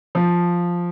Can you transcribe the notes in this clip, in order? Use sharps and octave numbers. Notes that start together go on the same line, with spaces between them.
F3